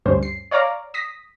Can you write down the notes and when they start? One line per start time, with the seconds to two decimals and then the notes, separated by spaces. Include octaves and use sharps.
0.06 D2 G2 G3 C#4 C5
0.23 C7
0.51 C#5 D5 F5 A#5 D6
0.94 D#6 A#6 B6